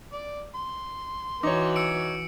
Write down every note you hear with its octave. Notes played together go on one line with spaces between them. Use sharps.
D5
C6
E3 D#4 F#4 C#5 D6
E6 C#7 D7